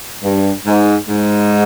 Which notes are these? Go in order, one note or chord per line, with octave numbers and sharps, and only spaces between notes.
G2
G#2
G#2